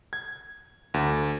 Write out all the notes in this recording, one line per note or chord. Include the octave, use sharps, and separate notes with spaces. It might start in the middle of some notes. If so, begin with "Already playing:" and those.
G#6
D2